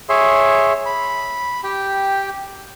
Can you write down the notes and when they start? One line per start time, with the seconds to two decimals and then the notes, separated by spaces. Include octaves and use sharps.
0.09 G#4 C#5 E5 C6
0.86 B5
1.64 G4 G5